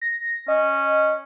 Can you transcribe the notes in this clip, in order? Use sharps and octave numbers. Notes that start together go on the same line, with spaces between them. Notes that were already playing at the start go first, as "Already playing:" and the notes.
A#6
C#4 D#5